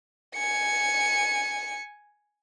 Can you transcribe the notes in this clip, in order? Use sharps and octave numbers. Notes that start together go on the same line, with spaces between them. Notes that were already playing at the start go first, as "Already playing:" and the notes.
G#5 C#7